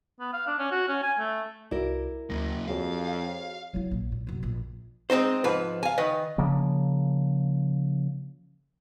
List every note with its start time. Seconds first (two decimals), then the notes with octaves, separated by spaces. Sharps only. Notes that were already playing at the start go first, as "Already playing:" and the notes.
0.20 B3
0.33 F5
0.47 D4
0.59 C#4
0.71 F#4
0.88 C#4
1.03 G#5
1.19 A3
1.71 C2 E4 F#4 A#4 D5
2.30 D2 F#3 A#3 A#6
2.68 F2 F#4 G#4 C#5 F5
3.74 F#3 E4
3.91 A#1
4.12 A#2
4.27 C2 F#2
4.43 A#1
5.10 G#3 C4 D#4 C5
5.44 G#2 F3 B4
5.83 F5 G#5
5.98 D#3 B4 D#5
6.38 C#3 F3 A#3